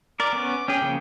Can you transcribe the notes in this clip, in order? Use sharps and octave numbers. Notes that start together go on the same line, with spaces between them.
A#4 D5 D6
B3 C#4
C#4 G#4 G5
C#3 F3 A#3